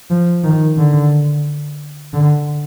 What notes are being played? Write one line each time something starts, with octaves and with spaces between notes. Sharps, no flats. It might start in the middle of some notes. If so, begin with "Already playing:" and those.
F3
D#3
D3
D3